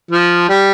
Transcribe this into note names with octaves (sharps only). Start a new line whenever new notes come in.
F3
G3